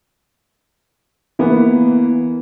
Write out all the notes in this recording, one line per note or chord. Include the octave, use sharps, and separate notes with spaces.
E3 A#3 B3